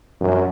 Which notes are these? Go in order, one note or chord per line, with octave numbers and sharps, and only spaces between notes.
F#2